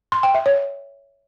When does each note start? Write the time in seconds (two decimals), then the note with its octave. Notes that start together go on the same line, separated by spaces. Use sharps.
0.12 C6
0.23 G5
0.34 E5
0.46 C#5